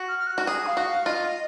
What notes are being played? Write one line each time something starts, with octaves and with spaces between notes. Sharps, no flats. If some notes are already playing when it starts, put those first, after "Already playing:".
Already playing: F#4
F6
F6
F#6
F#4
G#4 D#6
F5
F#4
F5
F4 D#5